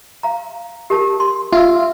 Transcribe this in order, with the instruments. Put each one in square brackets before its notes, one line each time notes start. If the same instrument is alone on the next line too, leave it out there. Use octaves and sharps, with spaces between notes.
[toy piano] F5 A#5
G4 A#4 A5
C6
[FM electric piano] F4 [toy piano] E5 E6